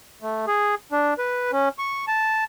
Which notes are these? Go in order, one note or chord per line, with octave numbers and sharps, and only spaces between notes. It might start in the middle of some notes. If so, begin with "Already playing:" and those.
A3
G#4
D4
B4
C#4
C#6
A5